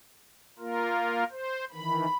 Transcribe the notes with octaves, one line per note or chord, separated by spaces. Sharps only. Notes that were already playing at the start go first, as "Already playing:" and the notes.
A#3 F4 A#4
C5
D#3 E3 B5